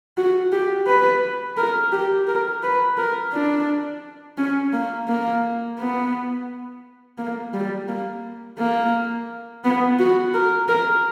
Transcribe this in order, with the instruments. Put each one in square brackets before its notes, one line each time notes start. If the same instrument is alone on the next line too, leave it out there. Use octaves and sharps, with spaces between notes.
[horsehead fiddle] F#4
G4
B4
A#4
G4
A#4
B4
A#4
D4
C#4
A#3
A#3
B3
A#3
G3
A#3
A#3
B3
F#4
A#4
A#4